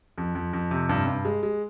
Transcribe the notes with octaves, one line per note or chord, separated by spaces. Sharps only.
F2
F2
F2
C3
G2
G2
G#3
G#3